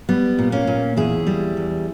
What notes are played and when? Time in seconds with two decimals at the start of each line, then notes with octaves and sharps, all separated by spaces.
0.09 G3 B3
0.39 A#2
0.52 A#3 C#4
0.67 A#2
0.97 E2 E4 G#4
1.27 G3
1.57 E2